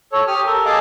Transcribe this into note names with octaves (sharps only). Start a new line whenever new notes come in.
A4 C#5
G4 D#6 F6
A4 A#4
G#4 A4 D#5 F5 A5 D6